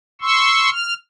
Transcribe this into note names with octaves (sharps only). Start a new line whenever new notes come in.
C6 C#6 E6
F6